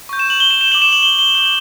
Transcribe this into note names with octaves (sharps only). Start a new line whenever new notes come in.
C#6 G6
E7
F#7
G7
E7
E7
D6 G6 F#7
E7
F#7
G7
G7
D6 G6 F#7